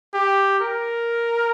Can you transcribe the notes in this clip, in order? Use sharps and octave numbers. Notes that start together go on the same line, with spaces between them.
G4
A#4